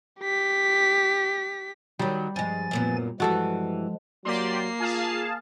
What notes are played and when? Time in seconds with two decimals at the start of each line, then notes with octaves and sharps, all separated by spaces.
0.21 G4 B6
1.99 D#3 F#3 G3
2.36 G2 F3 G#3 G#5 A6
2.71 F#2 A#2 B3
3.20 G2 E3 F3 G3 G#3 F#4 A4
4.25 F#3 A#3 G4 D5 C6 C7
4.80 F4 G#4 F5 A5